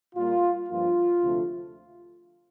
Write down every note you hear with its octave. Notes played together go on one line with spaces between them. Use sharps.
A#2 G3 A#3 F4
G2 F3 A#3 F4
D2 C3 F3 A3